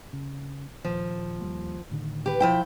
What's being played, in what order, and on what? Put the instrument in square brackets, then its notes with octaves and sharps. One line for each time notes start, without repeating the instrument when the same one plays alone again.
[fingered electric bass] C#3
[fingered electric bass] A#1 D#2 [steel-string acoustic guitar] F3
[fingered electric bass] D#2 G3 A#3
A2 D3 D#3
[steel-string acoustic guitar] G4 B4
[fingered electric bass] B1 [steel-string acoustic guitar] F3 E4 G5